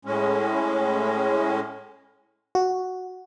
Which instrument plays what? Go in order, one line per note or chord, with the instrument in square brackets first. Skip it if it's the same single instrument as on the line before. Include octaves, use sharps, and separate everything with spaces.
[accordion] A2 G#3 C#4
[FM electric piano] F#4